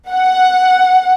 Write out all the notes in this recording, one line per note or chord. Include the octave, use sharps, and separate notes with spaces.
F#5